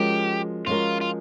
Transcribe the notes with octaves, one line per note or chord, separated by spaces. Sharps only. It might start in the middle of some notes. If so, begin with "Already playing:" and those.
Already playing: F3 G#3 C#4 F#4 G4 A#4
F3 G#3 C#4 F4 F#4 A#4
F4